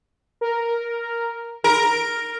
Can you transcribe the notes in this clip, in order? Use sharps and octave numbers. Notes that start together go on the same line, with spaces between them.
A#4
A#4 D7